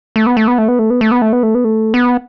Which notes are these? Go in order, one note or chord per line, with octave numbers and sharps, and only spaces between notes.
A3
B3
A3
B3
A3
B3
A3
B3
A3
B3
A3
B3
A3
B3
A3
B3